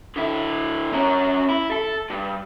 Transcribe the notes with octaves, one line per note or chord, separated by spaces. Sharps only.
D3 E4
C#4 A#4
E4
A4
G2